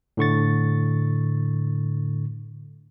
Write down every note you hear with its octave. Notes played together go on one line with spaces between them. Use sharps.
A2 D3 C#6 A6